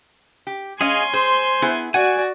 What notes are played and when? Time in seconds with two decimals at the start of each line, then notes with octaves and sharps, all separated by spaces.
0.47 G4
0.81 C#4 G#4 D#5 F5 G#5 C6
1.14 G#4 C5
1.62 B3 E4 G#4
1.94 F#4 D5 F#5 G#5